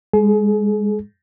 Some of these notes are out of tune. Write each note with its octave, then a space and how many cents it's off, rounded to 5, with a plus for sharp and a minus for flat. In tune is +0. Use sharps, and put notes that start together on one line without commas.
G#3 -30 G#4 +35